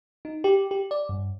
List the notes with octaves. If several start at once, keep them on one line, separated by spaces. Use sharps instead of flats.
D#4
G4
G4
D5
G2